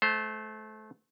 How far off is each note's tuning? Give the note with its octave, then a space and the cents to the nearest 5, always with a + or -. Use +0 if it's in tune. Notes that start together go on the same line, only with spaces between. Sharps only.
A3 -25 C5 +0 A#5 +0